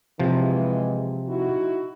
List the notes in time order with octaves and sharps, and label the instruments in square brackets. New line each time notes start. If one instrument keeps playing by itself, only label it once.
[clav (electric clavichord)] C3 F3 [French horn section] E3 G#3
[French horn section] D#4 E4 F#4